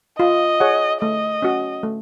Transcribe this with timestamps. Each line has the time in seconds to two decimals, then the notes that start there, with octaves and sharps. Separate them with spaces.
0.19 F4 D#5
0.60 G#4 C#5 F#5
1.01 A3 D#5
1.42 C#4 F#4
1.83 A3